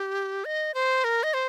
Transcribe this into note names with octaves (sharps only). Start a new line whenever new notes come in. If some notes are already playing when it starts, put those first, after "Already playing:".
Already playing: G4
D#5
C5
A#4
D#5
C5